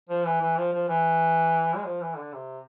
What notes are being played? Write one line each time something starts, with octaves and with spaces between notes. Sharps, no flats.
F3
E3
E3
F3
F3
E3
G#3
F3
E3
D3
C3